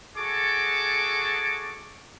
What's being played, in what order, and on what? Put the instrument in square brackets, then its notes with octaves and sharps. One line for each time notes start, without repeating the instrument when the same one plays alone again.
[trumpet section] F#4 G#4 A4 A5 C#6 D6